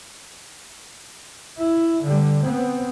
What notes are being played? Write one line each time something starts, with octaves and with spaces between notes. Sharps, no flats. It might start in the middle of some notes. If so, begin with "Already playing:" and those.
E4
D3 G3
B3 C4